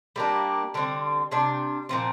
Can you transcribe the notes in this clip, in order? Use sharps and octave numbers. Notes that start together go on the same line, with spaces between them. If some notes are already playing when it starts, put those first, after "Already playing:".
G3 A#3 D4 G4
D3 G3 C4
C3 G3 D4
A#2 F3 C4